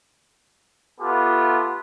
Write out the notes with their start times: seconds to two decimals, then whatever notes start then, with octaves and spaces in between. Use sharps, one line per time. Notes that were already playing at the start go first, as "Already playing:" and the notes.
1.00 A3 B3 F4 G4 A4